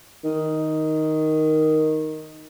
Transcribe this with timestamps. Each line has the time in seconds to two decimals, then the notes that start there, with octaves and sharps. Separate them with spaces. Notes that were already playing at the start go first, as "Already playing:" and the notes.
0.24 D#3